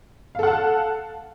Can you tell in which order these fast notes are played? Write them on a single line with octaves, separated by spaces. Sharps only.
F5 A4 F#5 A5